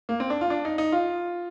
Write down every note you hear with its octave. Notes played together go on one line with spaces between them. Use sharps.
A#3
C4
D4
F4
D4
D#4
D#4
F4